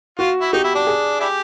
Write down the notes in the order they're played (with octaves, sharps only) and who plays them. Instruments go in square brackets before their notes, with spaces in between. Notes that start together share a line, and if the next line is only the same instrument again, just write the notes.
[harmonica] F4 [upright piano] F#4
[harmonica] E4
[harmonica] D#4 [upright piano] G4
[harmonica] E4
D4
[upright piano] G#4
[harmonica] D4 E4 G4